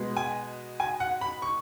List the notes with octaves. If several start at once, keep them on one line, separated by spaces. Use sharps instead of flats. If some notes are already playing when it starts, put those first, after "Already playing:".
Already playing: B2 G#3 B3
G#5
G#5
F#5
B5
C#6